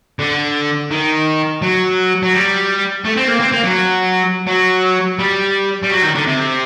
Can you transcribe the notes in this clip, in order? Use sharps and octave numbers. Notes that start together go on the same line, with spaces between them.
D3
D#3
F#3
F#3
G3
A3
C4
A#3
C4
A#3
F#3
F#3
G3
G3
F#3
D#3
D3
C3